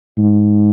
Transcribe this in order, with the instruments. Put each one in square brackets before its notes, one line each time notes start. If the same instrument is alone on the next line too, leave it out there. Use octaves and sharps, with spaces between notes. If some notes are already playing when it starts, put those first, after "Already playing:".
[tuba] G#2